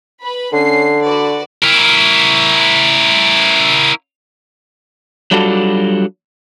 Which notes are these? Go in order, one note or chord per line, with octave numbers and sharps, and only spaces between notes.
B4 B5
D3 C#4 C7
F#4 B4 D5
E4 A#4
F#3 G3 D4 F4 F#4 A4